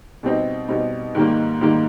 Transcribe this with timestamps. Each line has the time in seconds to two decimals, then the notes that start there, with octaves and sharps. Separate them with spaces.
0.23 B2 G3 C4 D#4
0.69 B2 G3 C4 D#4
1.15 G#2 D#3 G3 A#3
1.61 G#2 D#3 G3 A#3